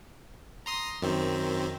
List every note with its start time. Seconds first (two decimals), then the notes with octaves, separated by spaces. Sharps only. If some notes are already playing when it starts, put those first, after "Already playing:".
0.66 A#5 C6 D#6
1.02 F#2 D#3 C4